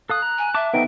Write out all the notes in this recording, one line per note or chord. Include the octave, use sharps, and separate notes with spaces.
A4 F5 D#6 F#6
A#5
G#5
E5 A5 D6
B3 D#4 A4 C5 D#5 G5 D7